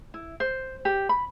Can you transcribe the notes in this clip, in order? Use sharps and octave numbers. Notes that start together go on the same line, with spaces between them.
E4
C5
G4
B5